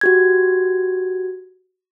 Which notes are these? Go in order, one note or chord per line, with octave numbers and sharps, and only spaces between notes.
F#4 G4 G#6